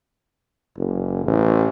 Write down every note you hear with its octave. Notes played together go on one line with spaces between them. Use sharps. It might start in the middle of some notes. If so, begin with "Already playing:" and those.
F#1
A1